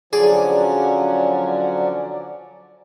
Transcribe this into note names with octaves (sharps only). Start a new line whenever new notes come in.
D3 F3 F#3 C#4 G#4 D5